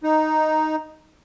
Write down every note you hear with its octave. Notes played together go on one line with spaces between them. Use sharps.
D#4